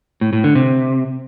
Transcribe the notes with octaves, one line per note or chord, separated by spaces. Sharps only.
A2
A2
D3
C3